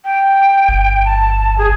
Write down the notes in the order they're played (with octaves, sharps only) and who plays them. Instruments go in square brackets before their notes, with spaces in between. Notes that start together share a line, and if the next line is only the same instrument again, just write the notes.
[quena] G5
[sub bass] G1
[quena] A5
G#4